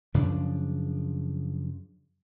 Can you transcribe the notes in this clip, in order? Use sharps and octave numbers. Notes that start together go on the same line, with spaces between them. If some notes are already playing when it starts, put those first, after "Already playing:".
F#2 C#3 F3 D4